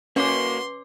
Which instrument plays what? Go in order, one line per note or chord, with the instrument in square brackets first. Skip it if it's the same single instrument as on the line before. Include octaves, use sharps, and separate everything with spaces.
[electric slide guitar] A#3 F#4 [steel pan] C#4 [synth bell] B4 D6 [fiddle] C6